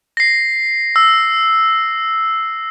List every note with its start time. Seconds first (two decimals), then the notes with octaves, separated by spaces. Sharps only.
0.17 A#6 C7
0.96 E6